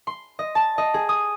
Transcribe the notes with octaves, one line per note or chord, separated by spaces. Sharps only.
C6
D#5
A5
D#5
G#4
D#6